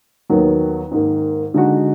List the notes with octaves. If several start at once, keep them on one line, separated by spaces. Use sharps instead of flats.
D#2 D#3 F#3 B3
G#2 D#3 A#3
D3 G#3 D#4 F#4